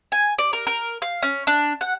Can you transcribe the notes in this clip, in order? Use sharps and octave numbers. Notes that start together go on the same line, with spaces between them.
G#5
D5
A#4
A#4
F5
C#4
D4
F#5